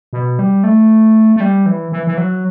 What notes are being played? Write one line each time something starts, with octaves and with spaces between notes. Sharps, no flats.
B2
G3
A3
A3
G3
E3
E3
E3
F#3